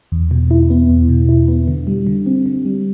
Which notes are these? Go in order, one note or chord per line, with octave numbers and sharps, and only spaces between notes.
E2
B2
E4
B3
E2
B2
E4
B3
D3
G3
D3
C4
D3
G3